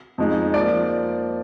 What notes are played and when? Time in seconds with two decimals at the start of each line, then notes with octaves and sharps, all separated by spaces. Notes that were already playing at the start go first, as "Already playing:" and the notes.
0.18 F2 F3 G#3 D#4
0.54 F3 A#3 D5